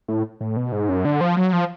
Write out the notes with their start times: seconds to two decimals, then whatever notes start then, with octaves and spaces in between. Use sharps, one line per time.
0.08 A2
0.41 A2
0.57 B2
0.72 G#2
0.89 F#2
1.05 D3
1.21 F3
1.37 F#3
1.53 F3